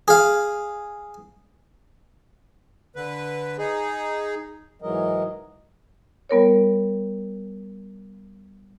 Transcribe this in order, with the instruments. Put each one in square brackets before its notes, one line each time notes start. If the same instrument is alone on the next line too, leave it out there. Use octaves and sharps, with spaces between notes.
[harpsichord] G#4 F5
[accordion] D3 B4
D#4 G#4
[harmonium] G#2 E3 F#3 G#3 A#4 D#5
[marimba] G3 B3 A#4 C#5